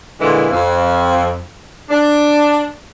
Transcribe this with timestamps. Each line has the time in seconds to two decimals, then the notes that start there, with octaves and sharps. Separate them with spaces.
0.21 A#2 D3 E3 G#3 E4
0.51 F2
1.90 D4